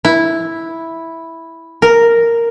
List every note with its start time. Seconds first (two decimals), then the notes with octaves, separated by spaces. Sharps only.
0.05 E4
1.82 A#4